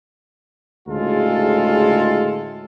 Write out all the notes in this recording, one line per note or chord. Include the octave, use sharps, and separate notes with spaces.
D2 A2 C#3 G#3 F4 A4